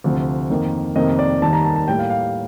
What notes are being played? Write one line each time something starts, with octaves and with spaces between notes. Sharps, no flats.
D2 C3 F3
F2 D#3 A#3
F2 C3 D#3 A#3 D#5
D5
D#2 D#3 G3 A#3 A5
A#5
A5
A5
A2 G3 A#3 G5
F5
F5